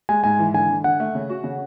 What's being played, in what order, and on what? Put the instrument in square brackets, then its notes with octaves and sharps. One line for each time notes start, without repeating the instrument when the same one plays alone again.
[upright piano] G#3 [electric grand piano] G#5
[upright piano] G#2 [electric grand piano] G#5
[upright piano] E3
[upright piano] D3 [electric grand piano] G#5
[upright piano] D3
[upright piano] D3 [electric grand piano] F#5
[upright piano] A3
C#3
F#4
C#3